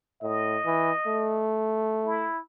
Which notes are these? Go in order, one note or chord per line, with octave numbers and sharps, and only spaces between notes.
A2 D#5
E3
A3
E4